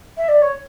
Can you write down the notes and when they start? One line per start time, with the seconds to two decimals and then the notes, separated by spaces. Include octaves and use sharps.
0.17 E5
0.28 D5
0.42 C#5